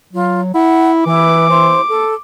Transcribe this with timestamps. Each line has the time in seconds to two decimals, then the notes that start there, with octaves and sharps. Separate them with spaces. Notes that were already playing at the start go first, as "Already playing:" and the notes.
0.13 F#3 F4
0.54 E4 F#5
1.06 E3 E4 B4 D6
1.49 E4 C5 C6
1.90 A4